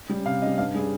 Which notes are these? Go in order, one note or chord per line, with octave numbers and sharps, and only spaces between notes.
G3 C#4
C3 F5
G3 C#4 D#5
G2 F5
G3 C#4 G#4